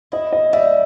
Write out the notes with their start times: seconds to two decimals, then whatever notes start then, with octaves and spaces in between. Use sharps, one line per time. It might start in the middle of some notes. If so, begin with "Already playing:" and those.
0.12 E4 D#5
0.32 D#5
0.53 G3 E5